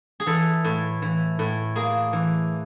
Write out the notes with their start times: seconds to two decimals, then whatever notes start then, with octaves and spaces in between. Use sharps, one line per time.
0.20 G#4
0.26 E3 A4
0.64 A2
1.02 E3
1.39 A2
1.76 A#3 G#4
2.13 E3